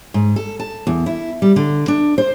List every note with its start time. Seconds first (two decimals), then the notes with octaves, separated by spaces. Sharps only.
0.14 G#2
0.36 A4
0.59 A5
0.87 E2
1.06 E4
1.42 G3
1.56 D3
1.88 D4
2.18 C5